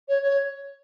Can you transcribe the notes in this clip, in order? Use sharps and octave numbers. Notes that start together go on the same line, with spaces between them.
C#5
C#5